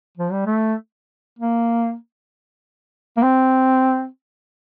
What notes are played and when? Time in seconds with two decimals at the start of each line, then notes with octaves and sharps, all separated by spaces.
0.18 F3
0.32 G3
0.47 A3
1.39 A#3
3.17 A#3
3.23 C4